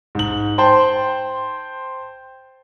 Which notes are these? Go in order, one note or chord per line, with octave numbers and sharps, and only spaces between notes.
G#2 F#7
C5 G5 A5 C6